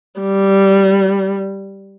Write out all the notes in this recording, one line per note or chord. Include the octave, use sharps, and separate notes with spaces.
G3